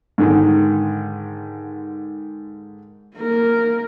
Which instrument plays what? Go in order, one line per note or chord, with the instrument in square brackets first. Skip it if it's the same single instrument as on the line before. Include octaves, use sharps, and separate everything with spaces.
[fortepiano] G#2 D3 D#3
[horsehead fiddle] A#3 A#4